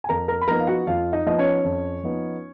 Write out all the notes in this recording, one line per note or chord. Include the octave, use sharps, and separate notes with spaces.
G#5
F2 A#4 A#5
A#4 A#5
B5
F3 B3 D#4 A#4 A#5
F5
F#4 F#5
F2 F4 F5
D#4 D#5
F3 B3 D#4 D#5
C#4 C#5
F2
F3 B3 D#4